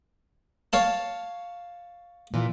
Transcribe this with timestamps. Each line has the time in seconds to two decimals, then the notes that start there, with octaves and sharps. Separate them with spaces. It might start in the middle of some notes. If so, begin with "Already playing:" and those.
0.73 C#5 F5 A5
2.34 A#2 E3